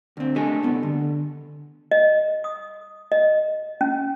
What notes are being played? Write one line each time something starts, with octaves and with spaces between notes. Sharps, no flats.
D2 C4
A3 D4 G4 A4 D#5 G#5
C2 G2 B3
D3
D#5
D#6
D#5
C#4